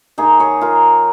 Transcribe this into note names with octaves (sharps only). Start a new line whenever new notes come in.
D#3 A#3 D#4 G#4
G#4 C#5
F4 A#4